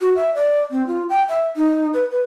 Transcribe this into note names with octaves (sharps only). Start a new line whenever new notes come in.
F#4
E5
D5
C4
F4
G5
E5
D#4
B4
B4